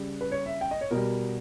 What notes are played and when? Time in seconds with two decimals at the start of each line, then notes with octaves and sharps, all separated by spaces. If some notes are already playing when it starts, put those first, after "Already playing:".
Already playing: C#3 G3
0.21 B4
0.32 C#5
0.46 E5
0.61 G5
0.71 D#5
0.81 C#5
0.91 B2 G3 A#4